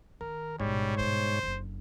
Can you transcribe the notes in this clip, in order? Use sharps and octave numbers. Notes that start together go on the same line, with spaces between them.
D#3 A#4
A1 G#2 B2 G3 C#5
G2 B2 C5
F#1 D3